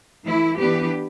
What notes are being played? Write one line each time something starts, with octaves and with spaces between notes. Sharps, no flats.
E3 A3 E4
E3 B3 D4 G4 B4